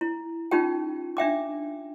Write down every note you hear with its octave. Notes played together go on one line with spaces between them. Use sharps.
E4
C#4 D#4 F4 G4 G5
D4 E5 G5 D6